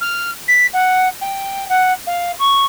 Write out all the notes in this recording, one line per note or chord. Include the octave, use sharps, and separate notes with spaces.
F6
B6
F#5
G5
F#5
F5
C#6